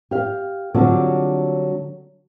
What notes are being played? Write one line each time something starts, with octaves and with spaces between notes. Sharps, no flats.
G4 F5
D3 F#3 G3 C4 D4 F4